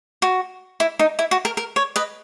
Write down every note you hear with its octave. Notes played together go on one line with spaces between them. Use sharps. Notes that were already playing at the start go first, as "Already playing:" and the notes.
F#4
E4
D#4
E4
F#4
A#4
A#4
C#5
B4 D#5